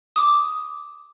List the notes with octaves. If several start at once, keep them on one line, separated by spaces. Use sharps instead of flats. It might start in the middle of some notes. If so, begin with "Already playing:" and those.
D6 D#6